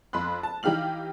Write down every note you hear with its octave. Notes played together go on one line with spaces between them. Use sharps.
F2 B5 C6 F#6
A5
E3 D#4 G4 F5 F6 F#7